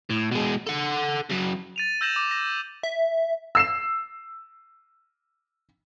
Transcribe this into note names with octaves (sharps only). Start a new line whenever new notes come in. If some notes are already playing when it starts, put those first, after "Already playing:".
A2
B2 G#3
A4 F#5
C#3 F#3
A6 D#7 F7
E6 G6 A#6 E7 F#7
D6
A#6
E5
E6 C7 E7